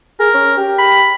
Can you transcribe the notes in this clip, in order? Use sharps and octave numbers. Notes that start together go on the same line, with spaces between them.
G#4 A#4
C#4
G4
B5